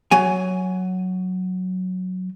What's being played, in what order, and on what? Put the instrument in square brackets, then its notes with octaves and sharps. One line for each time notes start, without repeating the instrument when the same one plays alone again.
[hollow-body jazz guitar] F#3 G#5